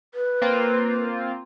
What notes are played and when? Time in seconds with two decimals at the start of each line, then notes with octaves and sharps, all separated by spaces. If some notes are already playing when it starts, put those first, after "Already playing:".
0.14 B4
0.42 A#3 C4 F4